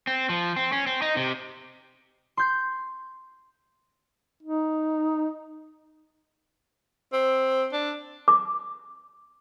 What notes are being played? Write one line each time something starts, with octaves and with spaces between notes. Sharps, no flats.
C4
F3
C4
C#4
C4
D#4
C3
C6 G6 C7
D#4
C4
D4
D6